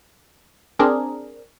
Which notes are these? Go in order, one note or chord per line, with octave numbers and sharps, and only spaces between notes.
C4 D4 G#4 A#4